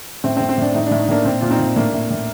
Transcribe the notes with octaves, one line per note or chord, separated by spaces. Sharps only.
A2 C4
A2 C4
C4
A2 D4
A2 D#4
A2 D4
D#4
A2 A#3 D4
A#2 C4
A#2 F4
C4 D#4
A#2
A2 A#3 D4
A2
A2